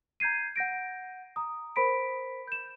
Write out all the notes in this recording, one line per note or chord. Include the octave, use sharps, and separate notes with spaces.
A#5 G6 G#6 C7 D#7
F#5 G6 A#6 D7
A#5 D#6
A#4 C5 B5 B6 D7
G6 E7